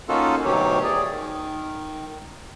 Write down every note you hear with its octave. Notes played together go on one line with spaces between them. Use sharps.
A#3 C#4 D#4 F4 F#4 A4
D2 B2 D#3 F#3 G4 C#5
G#4 D5
D#3